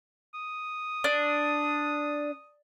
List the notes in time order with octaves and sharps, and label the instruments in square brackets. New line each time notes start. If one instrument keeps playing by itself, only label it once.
[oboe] D#6
[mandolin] D4